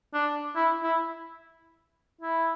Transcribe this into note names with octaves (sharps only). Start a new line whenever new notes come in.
D4
E4
E4
E4